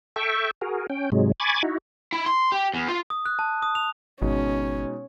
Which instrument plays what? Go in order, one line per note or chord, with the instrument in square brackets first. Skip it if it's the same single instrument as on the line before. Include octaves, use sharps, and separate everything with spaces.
[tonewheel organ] A4 E5 G5 C#6
F#4 G#4 A#4
C#4 G5
G#2 C3 F#3 G#3
G#5 B5 C#6 D6 G#6 A6
D#4 E4 F#4
[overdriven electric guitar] E4
C6
G4
E2
F4
[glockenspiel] D#6
F#6
A5
D#6
F7
[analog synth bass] G#1 [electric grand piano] B2 G#3 D#4 [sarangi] C#4